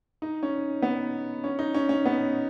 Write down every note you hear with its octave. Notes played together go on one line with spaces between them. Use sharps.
D#4
C#4
B3
C#4
D#4
C#4
C#4
B3